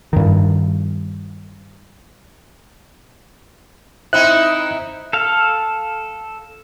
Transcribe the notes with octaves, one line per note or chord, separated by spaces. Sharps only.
G2 D#3
C4 D#4 E4 E5 F#6
A4 F5